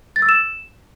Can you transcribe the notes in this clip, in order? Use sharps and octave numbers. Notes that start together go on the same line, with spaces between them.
A6
E6
E7